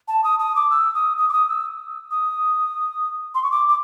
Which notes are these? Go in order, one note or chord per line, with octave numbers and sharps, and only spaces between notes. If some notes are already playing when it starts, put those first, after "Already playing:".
A5
D#6
D#6
D6
E6
D#6
D#6
D6
D#6
E6
D#6
C6
C#6
D6
D6